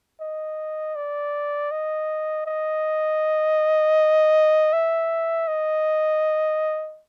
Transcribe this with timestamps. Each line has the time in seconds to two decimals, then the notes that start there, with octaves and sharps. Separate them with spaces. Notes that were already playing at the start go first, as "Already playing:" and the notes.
0.21 D#5
0.96 D5
1.71 D#5
2.46 D#5
4.73 E5
5.48 D#5